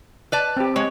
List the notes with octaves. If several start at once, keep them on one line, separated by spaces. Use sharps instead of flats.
B4 D5 A5
C4 G4
G#3 C#5